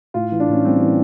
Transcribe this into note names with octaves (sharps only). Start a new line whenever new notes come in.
A2 F4
E3
D4
A2 C#4
G3 C4
E3